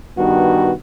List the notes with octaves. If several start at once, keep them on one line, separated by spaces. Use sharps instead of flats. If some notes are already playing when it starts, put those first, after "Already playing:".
G2 D#3 B3 F#4